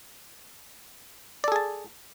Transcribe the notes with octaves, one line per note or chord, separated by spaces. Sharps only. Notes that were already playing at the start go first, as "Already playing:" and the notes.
G#4 A4 D5 A5